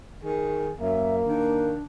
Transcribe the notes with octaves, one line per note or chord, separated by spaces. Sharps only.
D#3 G#4
F#2 A#3 E5
D#3 D4